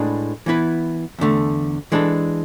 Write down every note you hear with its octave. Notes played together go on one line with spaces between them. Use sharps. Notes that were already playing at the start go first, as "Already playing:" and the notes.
Already playing: A2 G#3 D4 G#4 B4
E3 B3 E4 B4
E2 D3 A3
E3 G#3 D4 A4